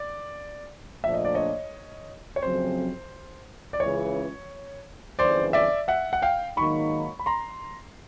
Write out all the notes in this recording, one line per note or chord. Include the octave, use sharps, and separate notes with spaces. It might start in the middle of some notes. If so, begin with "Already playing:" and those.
Already playing: D5
A#1 A#2 F3 A3 D4 E5
D#5
D5
C#5 D#5
C#5
F2 C#3 F#3 A3 C4 C5
D5
C#2 C#3 E3 C#5
G1 F2 C#3 E3 C5 D5
D5 E5
E5 F#5
F#5
F5 G5
G#2 D#3 F#3 A#3 D#4 B5 C#6
B5
A#5 C6